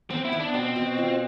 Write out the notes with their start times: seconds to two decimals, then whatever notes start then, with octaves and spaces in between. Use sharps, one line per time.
0.10 B3 C4
0.25 E4
0.32 B3
0.40 D4
0.54 B2 C4
0.76 B2
0.98 F4